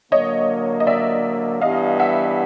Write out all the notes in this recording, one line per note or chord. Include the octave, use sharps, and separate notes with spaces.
D3 F#3 A#3 C#5 D#5
D#5
D5 E5
G2 E3 G3 B3 D#5 F5
E5 F#5